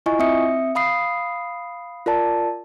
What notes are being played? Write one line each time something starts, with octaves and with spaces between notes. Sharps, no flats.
E4 F4 D#5 G#5 C#6
C4 E5 D#6 C#7
F5 B5 D#6 C7
F4 A#4 D5 A5